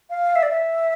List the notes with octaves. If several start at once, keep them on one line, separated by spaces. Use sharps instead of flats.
F5
E5
D5
E5